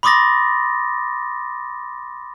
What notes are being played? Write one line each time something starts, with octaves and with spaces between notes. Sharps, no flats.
B5 C6 D6 D#6 A6 A#6